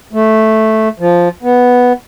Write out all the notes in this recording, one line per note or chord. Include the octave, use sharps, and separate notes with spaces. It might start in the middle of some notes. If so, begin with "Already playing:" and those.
A3
F3
B3